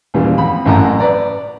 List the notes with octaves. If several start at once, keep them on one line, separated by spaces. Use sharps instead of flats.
D#2 A#2 C#3 E3 G3
F2 B5
A1 F#2 A2 F#5 A#5
B4 D5 A#5